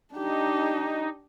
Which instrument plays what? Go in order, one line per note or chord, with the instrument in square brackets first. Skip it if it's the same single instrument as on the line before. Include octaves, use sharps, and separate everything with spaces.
[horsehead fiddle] D4 G4 [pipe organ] D#4